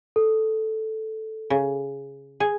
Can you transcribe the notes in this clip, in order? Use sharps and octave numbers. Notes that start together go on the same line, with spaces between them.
A4
C#3
G#4